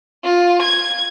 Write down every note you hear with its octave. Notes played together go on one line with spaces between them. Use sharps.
F4
G#6